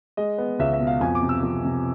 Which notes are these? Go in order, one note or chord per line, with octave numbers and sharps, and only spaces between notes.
G#3 D#5
B3
C#2 E5
E5
B2
F5
F2 G#5
D6
C3
E6
F2
C3